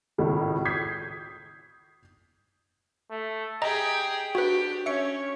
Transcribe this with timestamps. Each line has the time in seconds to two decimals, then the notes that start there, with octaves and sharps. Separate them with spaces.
0.18 G#1 C#2 A2
0.65 D#6 G6 G#6 B6 C7
3.11 A3
3.62 G4 G#4 D#5 G5 A#5
4.35 D4 F#4 G4 B4
4.86 C#4 C#5 E5 C#7